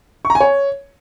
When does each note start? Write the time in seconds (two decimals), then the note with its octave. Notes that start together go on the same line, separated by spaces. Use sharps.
0.25 C#6
0.30 A#5
0.35 G#5
0.40 C#5